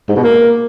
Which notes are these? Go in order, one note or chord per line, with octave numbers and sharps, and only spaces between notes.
G#2
B2
A#3